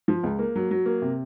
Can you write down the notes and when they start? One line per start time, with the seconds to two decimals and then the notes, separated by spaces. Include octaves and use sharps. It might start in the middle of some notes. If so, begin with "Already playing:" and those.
0.08 F3
0.23 C#2
0.39 A#3
0.56 F#3
0.71 F#3
0.86 A#3
1.02 C3